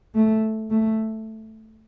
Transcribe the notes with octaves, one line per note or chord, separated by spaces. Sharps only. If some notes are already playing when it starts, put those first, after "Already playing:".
A3
A3